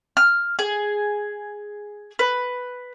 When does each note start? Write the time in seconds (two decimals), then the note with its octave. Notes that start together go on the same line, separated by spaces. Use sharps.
0.17 F6
0.59 G#4
2.19 B4